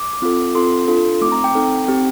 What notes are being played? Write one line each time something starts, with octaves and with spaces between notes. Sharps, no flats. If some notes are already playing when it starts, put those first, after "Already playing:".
Already playing: D6
C4 F4 A4
C4 F4 A4 C6
D4 F4 A4
A3 C4 D#4 D6
A#5
G5
C4 D#4 A4
C4 G4